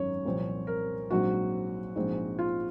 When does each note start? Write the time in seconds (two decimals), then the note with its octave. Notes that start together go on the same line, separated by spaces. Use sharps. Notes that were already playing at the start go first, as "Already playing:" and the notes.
Already playing: G#1 F#2 D#3 F#3 C#5
0.25 C2 A#2 F3 C4
0.67 A#4
1.10 A#1 G#2 F#3 C4 F#4
1.96 A#1 G#2 F3 G#3 C4
2.39 F4